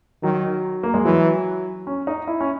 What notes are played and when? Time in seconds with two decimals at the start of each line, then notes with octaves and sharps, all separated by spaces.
0.23 D#3 F#3
0.83 A#3
0.94 G#3
1.05 E3 F#3
1.87 C#4
2.07 D#4
2.28 E4
2.41 C#4